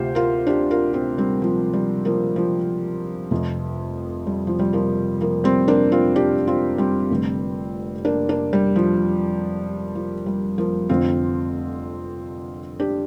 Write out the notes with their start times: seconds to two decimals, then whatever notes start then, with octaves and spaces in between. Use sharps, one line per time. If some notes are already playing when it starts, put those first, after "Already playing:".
Already playing: D2 C3 F4 G4 C5
0.15 F4 A#4
0.47 D4 G4
0.71 F4 A#4
0.94 C4 F4
1.18 G3 C4
1.42 F3
1.74 G3
2.05 F3 A#3
2.36 F3
3.31 F1 F2 C3
4.27 G3
4.47 F3
4.59 G3
4.73 F3 A#3
5.21 F3 A#3
5.44 G3 C4
5.68 A#3 D4
5.92 C4 F4
6.16 D4 G4
6.47 C4 F4
6.78 G3 C4
7.11 F1 F2 D3
8.05 A#3 D4
8.29 A#3 D4
8.53 G3
8.76 F3
9.95 F3
10.26 G3
10.58 F3 A#3
10.89 F1 F2 D3 C4 F4
12.80 D4 G4